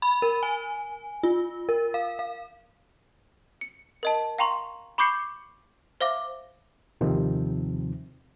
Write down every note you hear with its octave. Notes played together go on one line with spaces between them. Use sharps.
B5
A#4
G#5
F4
A#4
F5
F5
C#7
A#4 D#5 A5
F5 G5 A#5 C6 C#6
B5 C#6 D6 G6 C7 C#7
C5 E5 F5 D6
D#2 C3 D#3 F3 C4